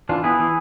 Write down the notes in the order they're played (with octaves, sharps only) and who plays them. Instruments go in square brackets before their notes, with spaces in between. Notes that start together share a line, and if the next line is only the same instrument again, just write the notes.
[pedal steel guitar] E3 D4 F4
B3 E4 G#4
E3